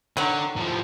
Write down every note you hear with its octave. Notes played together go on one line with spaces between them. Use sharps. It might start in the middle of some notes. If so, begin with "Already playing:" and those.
D3 D#3 F#3
A2 F3